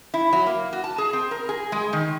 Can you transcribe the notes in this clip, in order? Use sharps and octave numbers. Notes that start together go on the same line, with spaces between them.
E4
F#3
A#3
F#4
A5
G#4
C4
A#4
G#4
G#3
D#3